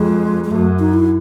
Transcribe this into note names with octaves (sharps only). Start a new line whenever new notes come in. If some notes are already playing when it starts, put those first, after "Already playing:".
Already playing: F2 G#3
G#3
F#2 A3
D#4
E4